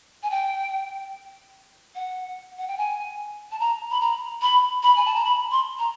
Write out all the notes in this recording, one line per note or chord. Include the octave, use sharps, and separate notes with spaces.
G#5
G5
F#5
F#5
G5
G#5
A5
A#5
B5
A#5
B5
B5
G#5
A5
A#5
B5
C6
A#5